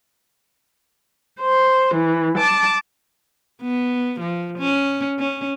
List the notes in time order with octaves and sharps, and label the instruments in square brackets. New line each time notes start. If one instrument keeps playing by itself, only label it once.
[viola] C5
E3
A5 D6
[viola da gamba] B3
F3
C#4
C#4